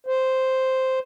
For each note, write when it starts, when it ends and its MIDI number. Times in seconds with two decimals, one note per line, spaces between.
0.06 0.99 72